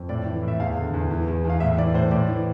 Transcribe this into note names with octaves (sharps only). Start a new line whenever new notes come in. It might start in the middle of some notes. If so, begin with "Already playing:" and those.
Already playing: F2
A2 D5
E3
A2 E5
E2 F5
D3
E2
E3
E2
E2 F5
A2 E5
E3 D5
A2 C5
A2 D5
E3